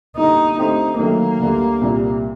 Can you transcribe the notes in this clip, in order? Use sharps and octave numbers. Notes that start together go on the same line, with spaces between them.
D3 G3 A#3 D#4
D3 A3 C4 D#4 G4 C5
D#3 F#3 A3 A#3
D2 D3 G3
C2 A#2 G3